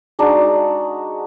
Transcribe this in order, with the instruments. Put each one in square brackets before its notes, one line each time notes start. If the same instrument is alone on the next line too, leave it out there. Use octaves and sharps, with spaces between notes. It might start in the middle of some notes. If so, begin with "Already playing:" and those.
[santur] G#3 D4 D#4 F#4